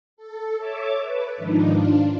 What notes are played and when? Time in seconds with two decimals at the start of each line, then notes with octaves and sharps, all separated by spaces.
0.17 A4
0.58 C#5 E5 A5 D6
1.00 B4
1.37 G#2 D#3 F3 D4 D#4
1.67 D4 F4